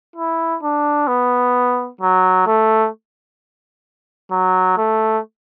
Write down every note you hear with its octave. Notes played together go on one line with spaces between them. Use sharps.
E4
D4
B3
F#3
A3
F#3
A3